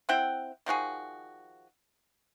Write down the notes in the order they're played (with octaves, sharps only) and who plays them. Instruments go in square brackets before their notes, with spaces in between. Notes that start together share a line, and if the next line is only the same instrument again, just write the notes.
[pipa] C4 E4 F#5 G5
D#3 F3 F#4 G#4